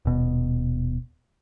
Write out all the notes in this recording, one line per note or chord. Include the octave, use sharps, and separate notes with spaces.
D#1 B2